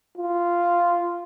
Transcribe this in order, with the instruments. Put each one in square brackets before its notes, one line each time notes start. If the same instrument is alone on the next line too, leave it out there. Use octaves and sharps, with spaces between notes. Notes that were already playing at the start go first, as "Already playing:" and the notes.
[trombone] F4